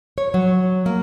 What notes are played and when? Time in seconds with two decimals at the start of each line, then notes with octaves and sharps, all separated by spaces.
0.18 C#5
0.34 F#3
0.86 A#3